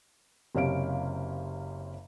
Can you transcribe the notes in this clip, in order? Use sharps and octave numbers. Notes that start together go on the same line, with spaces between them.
F#1 C3 C#4 F5 D7